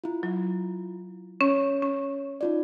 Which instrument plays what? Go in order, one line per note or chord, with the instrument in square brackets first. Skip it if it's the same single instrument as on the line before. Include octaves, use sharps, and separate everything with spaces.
[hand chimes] E4 F4
[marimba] F#3
[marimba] C#4 [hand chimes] C#5
[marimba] C#4
[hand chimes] D#4 F4 D5